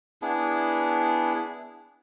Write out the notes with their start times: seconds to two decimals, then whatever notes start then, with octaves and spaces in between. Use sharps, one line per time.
0.22 B3 D4 E4 G#4